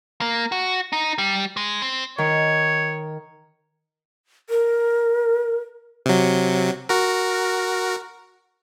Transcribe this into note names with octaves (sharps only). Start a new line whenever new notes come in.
A#3
F#4
D#4
G3
G#3
C4
D#3 C#5
A#4
C3 F#3
F#4 A#4